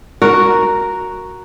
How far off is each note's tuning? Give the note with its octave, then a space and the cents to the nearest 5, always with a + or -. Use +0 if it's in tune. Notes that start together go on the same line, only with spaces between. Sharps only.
F#4 +0 A#4 +0